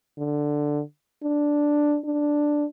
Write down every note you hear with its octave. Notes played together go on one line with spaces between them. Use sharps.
D3
D4
D4